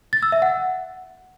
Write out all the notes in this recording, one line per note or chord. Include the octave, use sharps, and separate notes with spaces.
A6
E6
E5
F#5